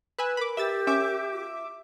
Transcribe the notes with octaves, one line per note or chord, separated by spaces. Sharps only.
B4 G#5 E6 F#6
A#4 B5 D6
G4 E5 E6 A6
C#4 E5 D6
F4